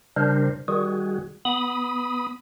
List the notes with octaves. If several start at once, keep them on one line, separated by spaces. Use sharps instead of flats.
C#3 G3 D4 A#4 C5
D#3 G3 F#4 G#4
B3 B5 D#6